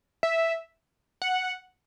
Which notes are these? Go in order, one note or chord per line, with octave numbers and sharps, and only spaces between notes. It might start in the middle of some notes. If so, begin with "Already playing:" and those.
E5
F#5